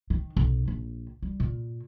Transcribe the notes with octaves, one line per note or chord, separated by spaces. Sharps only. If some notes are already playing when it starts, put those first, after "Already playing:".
D#3
B1
A#1
G3
A#2